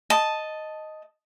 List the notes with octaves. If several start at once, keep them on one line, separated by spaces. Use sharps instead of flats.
D#5 A5